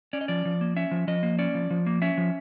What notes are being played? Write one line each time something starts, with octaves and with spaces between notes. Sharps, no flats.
C#4 D5
D#5
F3 D5
F3
A#3
C#4 E5
F3
F3 D#5
A#3
C#4 D5
F3
F3
A#3
C#4 E5
F3